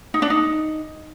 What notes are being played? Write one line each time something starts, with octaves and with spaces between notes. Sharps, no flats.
D#4
D4
D#4